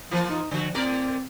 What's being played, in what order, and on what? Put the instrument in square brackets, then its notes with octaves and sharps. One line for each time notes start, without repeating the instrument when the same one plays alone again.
[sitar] E3 A#3 F4 [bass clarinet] F3
[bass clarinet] D#4
[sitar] D3 F#4 [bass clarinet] F3
[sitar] A2 A#4 D5 [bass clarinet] C4